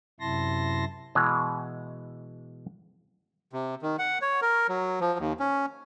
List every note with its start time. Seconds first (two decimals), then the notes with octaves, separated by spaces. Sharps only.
0.20 F#2 C3 E4 A5 C6 A#6
1.15 B2 E3 G#3
3.53 C3
3.82 D#3
3.99 F#5
4.22 C#5
4.42 A#4
4.69 F#3
5.01 F3
5.19 D#2
5.40 C#4